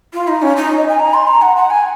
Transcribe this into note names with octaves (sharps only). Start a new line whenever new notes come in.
F4
D#4
C#4
D#4
D#5
G#5
A#5
C6
A#5
F#5
F#5
G#5